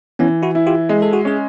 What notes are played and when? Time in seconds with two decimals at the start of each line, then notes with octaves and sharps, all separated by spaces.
0.19 E3 B3 C#4
0.43 E4 F#4
0.55 E4
0.67 F4 G4
0.89 G#3
1.02 A4
1.13 F#4 G#4
1.25 C#4 G#4